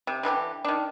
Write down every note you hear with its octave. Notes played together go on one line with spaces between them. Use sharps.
C3
D3 E3 E4 G4
D#3 D4